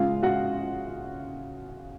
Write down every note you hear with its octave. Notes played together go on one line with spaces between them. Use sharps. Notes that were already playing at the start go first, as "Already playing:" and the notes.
Already playing: C#3 G#3 F4 F5
F#4 F#5